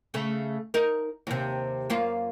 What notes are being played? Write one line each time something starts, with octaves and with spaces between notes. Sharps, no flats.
C#3 A3
D#4 A#4
D#2 C3
F#2 A#3 F4